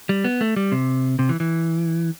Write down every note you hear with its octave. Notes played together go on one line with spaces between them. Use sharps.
G3
B3
A3
G3
C3
C3
E3
E3